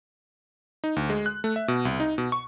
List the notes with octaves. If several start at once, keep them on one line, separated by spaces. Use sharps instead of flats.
D#4
D2
G#3
F#6
A3
E5
B2
C2
D#4
B2
C#6